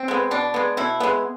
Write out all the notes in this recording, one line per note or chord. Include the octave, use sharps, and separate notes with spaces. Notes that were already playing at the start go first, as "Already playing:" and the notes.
Already playing: C4
G#3 B3
B2 D4
G#3 B3
B2 E4
G#3 B3